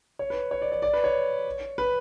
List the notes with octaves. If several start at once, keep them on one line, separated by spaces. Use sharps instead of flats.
C#5
B4
C#5
D5
D5
D5
B4
C#5
B4